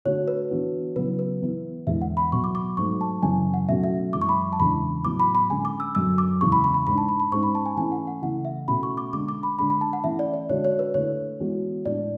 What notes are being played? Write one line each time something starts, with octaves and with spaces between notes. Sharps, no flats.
D3 A3 D4 F#4 C#5
B4
E3 B3 D4 F#4
C#3 F#3 B3 E4 B4
B4
E3 B3 E4
E2 D3 G#3 B3 E4 E5
F#5
B5
B2 F#3 B3 C#6
D6
D6
G#2 F#3 A3 C#6
A5
F#2 C#3 E3 G#5
F#5
B2 F#3 A3 C#4 F#4 E5
E5
F#2 E3 G#3 D6
C#6
B5
A5
E2 C#3 E3 G#3 D4 B5
A2 F#3 B3 E4 D6
B5
B5
D3 G#3 C#4 G#5
D6
E6
F#2 D3 F#3 E6
D6
E2 C#3 E3 G#3 C#6
B5
B5
B5
G#2 G#3 D4 B5
A5
B5
B5
G#2 G#3 C#4 C#6
B5
A5
G#5
E3 A3 C#4 E4 G#5
F#5
F#5
C#3 E3 A3 E4 F#5
E5
B2 A3 C#4 F#4 B5
C#6
D6
D3 G#3 D4 D6
D6
B5
D3 G#3 D4 B5
B5
A5
F#5
E3 A3 C#4 E4 E5
D5
D5
D3 G#3 D4 F#4 C#5
C#5
B4
D3 A3 E4 C#5
E3 G#3 B3 F#4
A2 G#3 D4 D5